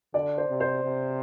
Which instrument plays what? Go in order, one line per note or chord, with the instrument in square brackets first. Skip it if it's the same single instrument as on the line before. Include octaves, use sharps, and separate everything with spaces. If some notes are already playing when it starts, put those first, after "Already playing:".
[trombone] D3 [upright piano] D5
[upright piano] C5
[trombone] C3
[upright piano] C5
[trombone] C3